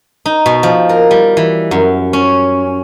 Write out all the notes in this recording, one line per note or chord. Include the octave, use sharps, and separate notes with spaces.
D#4
B2
F3
A#4
G3
E3
F#2
C#4